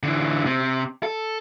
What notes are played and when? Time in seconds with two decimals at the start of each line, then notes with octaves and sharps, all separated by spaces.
0.03 D3 E3
0.46 C3
1.03 A4